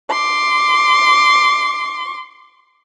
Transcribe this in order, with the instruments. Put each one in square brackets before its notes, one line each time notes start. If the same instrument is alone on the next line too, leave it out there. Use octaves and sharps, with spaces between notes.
[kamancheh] C6 D6